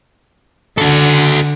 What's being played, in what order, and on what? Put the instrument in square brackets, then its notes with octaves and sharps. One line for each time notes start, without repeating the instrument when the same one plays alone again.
[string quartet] D3 [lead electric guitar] F#4 A4